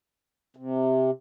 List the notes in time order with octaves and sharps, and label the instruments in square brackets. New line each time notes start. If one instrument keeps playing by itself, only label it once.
[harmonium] C3